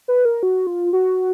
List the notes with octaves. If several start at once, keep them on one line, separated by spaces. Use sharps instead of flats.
B4
A#4
F#4
F4
F#4